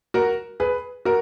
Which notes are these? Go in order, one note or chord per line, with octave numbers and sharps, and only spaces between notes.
F#4 A#4
G#4 B4
F#4 A#4